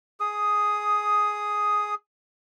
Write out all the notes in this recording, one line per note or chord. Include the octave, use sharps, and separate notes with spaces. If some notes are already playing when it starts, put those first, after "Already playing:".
G#4 D#6